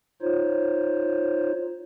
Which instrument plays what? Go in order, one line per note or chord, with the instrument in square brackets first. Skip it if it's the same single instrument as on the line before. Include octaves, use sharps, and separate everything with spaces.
[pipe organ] D#4 F4 C5 C#5